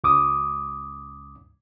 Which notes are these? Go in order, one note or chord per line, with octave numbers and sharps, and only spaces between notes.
C#2 D6 D#6